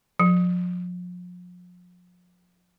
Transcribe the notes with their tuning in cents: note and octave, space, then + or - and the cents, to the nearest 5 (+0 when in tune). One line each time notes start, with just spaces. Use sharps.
F3 +40